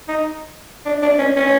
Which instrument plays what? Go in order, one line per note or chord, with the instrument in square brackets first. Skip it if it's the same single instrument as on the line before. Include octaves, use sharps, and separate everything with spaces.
[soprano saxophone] D#4
D4
D4
C#4
C#4